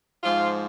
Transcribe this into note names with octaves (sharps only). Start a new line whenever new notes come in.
G#2 F3 F4